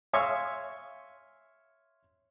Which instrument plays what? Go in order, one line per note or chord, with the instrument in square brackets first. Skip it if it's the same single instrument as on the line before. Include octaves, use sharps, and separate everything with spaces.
[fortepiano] C#5 E5 F5 G#5 C6 C#6